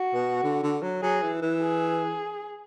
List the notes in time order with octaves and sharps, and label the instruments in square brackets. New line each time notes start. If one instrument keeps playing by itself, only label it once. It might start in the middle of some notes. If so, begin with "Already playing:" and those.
Already playing: [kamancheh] F#4
[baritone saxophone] B2
D3
D3
F#3
[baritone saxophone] F#3 [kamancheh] G#4
[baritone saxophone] E3
E3
[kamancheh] G#4